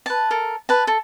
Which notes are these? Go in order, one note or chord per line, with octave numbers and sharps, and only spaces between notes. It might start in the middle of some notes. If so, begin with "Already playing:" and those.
B4 A5
A4 A#4
B4 A5
A4